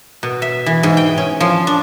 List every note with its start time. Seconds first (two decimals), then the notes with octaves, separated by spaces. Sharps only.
0.23 B2
0.42 E5
0.66 E3
0.83 G#2
0.97 G5
1.17 C#4
1.40 F3
1.67 D4